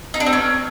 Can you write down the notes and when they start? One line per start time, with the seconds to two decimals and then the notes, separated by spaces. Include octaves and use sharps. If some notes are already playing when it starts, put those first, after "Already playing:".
0.14 D#4
0.20 D4
0.26 C4
0.33 C#4